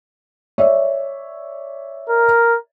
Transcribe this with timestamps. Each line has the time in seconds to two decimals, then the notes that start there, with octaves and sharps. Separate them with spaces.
0.58 C#5 D5 E5
2.09 A#4